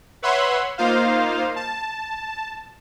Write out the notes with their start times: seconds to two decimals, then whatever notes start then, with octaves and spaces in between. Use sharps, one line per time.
0.22 B4 C#5 E5 F#5 B5 C6
0.78 A#3 D#4 F4 C5 F5
1.56 A5